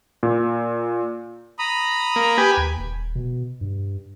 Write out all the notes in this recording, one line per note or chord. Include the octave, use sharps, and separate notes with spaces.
A#2
A#5 B5 D#6
A#3
G4 B4 G#5
D#2
D#1
B2
G2